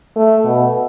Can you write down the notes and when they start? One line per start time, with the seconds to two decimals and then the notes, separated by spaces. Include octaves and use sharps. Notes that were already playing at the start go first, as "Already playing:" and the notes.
0.16 A3
0.44 B2